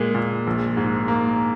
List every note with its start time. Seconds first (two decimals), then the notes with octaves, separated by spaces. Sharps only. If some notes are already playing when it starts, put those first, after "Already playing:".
Already playing: A#2 G#3 A#3
0.15 A#2
0.47 A#1
0.77 G#2
1.08 A#3